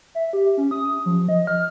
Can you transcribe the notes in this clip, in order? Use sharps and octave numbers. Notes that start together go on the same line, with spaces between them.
E5
G4
C#4
D#6
F3
D#5
F6